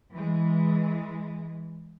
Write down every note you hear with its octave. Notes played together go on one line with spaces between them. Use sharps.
E3 G#3